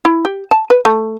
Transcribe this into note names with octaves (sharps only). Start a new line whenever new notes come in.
E4
G4
A5
B4
A3